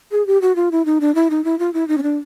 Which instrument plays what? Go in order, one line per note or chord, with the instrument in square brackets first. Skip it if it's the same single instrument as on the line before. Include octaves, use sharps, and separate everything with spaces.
[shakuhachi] G#4
G4
F#4
F4
E4
D#4
D4
E4
D#4
E4
F4
E4
D#4
C#4
D4